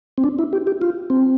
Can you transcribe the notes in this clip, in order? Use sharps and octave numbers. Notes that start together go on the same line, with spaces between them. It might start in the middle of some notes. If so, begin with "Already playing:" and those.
C4
D4
E4
G4
G4
F4
C4